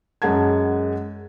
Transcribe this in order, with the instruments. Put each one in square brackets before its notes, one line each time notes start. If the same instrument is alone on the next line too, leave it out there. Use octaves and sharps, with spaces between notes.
[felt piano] F#2 G#3 F#5 A5 G#6